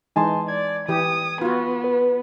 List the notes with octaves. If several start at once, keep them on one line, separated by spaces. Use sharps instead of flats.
E3 G#3 D#4 G#5 A5 C6
D5 G#6
E3 G4 D#6
B3 F4 F#4
B4